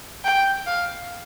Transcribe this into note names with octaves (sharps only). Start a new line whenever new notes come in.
G5
F5